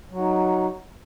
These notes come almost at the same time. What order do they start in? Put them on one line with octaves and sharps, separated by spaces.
F#3 F#4 D#4